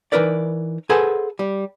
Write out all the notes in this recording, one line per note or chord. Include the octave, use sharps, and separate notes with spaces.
E3 C#4 D#4 A#4 B4 D5
G#4 A4 B4 C5 F#5 G#5
G3